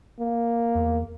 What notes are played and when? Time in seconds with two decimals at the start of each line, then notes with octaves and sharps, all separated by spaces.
0.20 A#3
0.75 E2